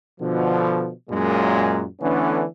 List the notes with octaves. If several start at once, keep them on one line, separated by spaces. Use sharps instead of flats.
B2 D3 F3
F#2 A#2 G#3
D3 E3 A3 B3 C#4 D4